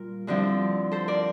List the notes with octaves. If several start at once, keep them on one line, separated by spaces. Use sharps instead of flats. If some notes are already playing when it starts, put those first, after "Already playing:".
Already playing: A#2 G3 F4 A#4
G2 D3 F3 C4 E4
A4 C5
A#4 D5